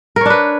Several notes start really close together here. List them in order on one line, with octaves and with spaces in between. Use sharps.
A#4 C#5 D4 B4